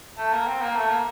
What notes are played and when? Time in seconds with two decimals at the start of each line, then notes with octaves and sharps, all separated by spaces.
0.18 A3
0.33 A#3
0.47 C4
0.62 A#3
0.76 A3
0.90 A#3